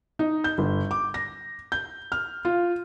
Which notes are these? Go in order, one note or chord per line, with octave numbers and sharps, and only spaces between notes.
D#4
G6
G1
D6
A#6
G6
F6
F4